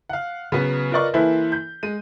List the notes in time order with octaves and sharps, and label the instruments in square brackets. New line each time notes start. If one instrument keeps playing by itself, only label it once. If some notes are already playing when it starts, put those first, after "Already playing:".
[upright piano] F5 F#5
C#3 F#3 B3
F4 A#4 B4 D5 D#5 C#6
E3 A#3 E4 A4 B4 C5
G6
G#3 D#7